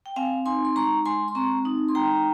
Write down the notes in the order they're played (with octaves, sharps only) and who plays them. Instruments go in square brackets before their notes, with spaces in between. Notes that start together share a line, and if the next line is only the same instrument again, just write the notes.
[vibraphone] G5
C4 F5 G#5
D#4 G#5 C6
C6
G#3 A#5 C#6
G#3 G#5 C6
C6
C4 A#5 C#6
D#4
C6
G#3 G5 A#5